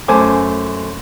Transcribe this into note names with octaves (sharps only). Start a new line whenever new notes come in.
F#2 A3 C5 G#5 D6